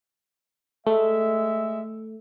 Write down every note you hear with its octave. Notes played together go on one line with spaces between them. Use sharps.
G#3 A3 E5